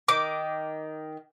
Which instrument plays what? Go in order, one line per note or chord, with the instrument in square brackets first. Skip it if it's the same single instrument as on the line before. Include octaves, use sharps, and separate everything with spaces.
[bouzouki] D#3 [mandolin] D6